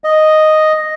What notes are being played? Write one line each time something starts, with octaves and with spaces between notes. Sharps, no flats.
D#5